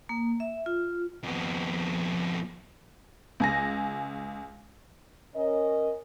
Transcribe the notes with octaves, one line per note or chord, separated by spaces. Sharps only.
A#3
E5
F4
F2 B3
C#2 G#5 A#6
C#4 A#4 D#5